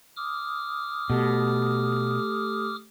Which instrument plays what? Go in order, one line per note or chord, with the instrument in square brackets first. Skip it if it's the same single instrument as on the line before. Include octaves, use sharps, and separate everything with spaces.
[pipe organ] D6 D#6 F6
[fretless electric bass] B2 [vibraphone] A3 G4 A4